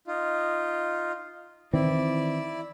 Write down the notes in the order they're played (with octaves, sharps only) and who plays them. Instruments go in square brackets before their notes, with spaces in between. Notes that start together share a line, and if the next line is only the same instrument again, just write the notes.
[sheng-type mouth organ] D#4 F4
[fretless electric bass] D#3 E3 C4 [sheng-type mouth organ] E4 D5